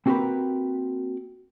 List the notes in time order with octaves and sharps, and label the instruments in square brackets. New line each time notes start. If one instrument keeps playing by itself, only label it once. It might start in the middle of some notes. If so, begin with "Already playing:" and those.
[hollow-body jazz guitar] A#3 C4 F#4 G4 A#4 B4